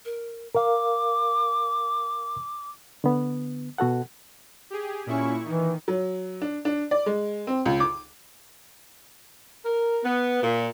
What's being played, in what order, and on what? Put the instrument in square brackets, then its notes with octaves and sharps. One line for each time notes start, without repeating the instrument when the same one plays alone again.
[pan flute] A#4
[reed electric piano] A#4 F5 [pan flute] D6
[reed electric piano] D3 B3
B2 F#4 A4 F#5
[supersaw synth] G4 G#4
[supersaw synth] A#2 E4 C#6 [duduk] C#4
[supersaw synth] D#3 [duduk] E3
[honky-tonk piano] F#3
D4
D4
D5
G#3
C4
C#2
D6
[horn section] A#4
B3
A#2